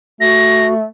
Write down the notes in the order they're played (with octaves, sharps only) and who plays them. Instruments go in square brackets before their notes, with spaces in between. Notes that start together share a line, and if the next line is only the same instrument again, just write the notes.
[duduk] A3 [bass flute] F#4 [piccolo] A#6